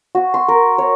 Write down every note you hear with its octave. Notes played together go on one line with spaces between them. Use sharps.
F#4
C6
A#4
C#5